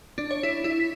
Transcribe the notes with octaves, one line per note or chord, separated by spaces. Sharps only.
D4
C#5
E4
E4
B6